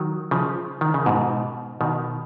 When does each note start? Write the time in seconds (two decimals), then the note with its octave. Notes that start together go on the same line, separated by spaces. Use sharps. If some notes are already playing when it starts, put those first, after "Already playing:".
Already playing: D#3 F#3
0.31 C#3 F3
0.81 D#3
0.94 C#3
1.06 G#2 B2
1.81 B2 D#3